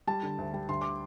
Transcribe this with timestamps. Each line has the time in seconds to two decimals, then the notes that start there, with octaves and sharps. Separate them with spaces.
0.07 G3 A5
0.23 D3
0.38 D2
0.54 G3
0.69 D2 C6
0.81 D6